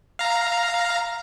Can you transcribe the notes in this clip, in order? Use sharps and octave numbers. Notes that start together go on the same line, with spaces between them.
F5 A#5